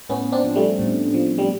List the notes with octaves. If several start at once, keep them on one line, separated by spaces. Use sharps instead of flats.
A2 B3 C#4
C4 D4
F3
G3 A3
A2
F3
G3